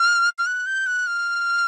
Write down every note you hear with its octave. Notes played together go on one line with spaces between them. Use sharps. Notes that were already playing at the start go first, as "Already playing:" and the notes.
Already playing: F6
F6
F#6
G6
F#6
F6